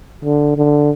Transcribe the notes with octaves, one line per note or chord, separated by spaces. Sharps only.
D3
D3